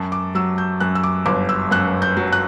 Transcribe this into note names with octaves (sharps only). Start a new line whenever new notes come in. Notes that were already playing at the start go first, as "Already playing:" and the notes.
Already playing: F#2 A5
D6
F#3 E6
G6
F#2 F#6
E6
D6
G1 D6
E6
F#2 F#6
G6
F#3
F#6